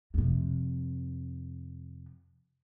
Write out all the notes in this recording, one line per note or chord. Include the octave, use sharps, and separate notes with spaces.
F2 C3